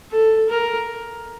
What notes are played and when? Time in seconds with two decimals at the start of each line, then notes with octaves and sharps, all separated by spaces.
0.11 A4
0.49 A#4